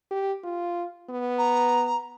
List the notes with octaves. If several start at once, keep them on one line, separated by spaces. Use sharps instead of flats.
G4
F4
B3
A#5